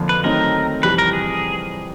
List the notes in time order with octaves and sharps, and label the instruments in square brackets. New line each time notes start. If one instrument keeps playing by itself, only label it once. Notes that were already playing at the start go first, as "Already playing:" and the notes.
Already playing: [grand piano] F2 D3 F3 A#3
[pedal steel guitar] B4
[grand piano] D#3 F#3 A3 C4 D#4 [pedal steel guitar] A#4
[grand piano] F2 C3 E3 G3 [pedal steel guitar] B4
[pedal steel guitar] A#4
G#4